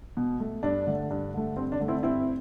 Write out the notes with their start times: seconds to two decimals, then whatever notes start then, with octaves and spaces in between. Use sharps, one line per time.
0.17 B2
0.40 A3
0.63 G2 D4
0.87 D3 A3
1.11 G2
1.34 D3 A3
1.56 G2 C4
1.72 D4
1.80 D3 A3
1.88 C4 E4
2.03 G2 C4 E4